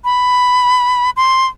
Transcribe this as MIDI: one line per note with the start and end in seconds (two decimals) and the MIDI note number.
0.04 1.10 83
1.16 1.47 84